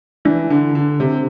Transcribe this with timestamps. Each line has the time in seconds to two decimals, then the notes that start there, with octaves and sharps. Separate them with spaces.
0.25 E3 D4
0.50 D3
0.75 D3
1.00 C3